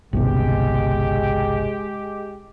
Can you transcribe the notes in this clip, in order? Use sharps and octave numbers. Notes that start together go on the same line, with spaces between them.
G1 C2 B2 G#3 G4